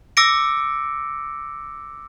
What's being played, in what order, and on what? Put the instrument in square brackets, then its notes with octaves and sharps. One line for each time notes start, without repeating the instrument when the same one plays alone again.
[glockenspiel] D6 E6 A#6 C#7 D7